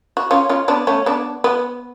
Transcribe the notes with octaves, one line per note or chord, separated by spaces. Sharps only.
F#4
C#4 F4
C#4 F4
B3 D4
A3 C#4
B3 D4
B3